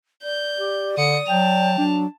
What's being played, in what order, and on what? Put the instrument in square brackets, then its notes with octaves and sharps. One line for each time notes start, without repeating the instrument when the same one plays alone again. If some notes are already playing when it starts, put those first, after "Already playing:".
[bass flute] D5 [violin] G6
[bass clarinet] G4
[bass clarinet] D3 [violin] D#6 C#7
[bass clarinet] F#3 [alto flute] G5 [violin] A5 F7
[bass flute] F#3 [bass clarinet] D4